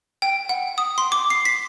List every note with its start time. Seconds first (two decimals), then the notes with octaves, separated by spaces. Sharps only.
0.22 G5
0.49 F#5
0.78 D#6
0.98 C6
1.12 D6
1.30 C7
1.45 B6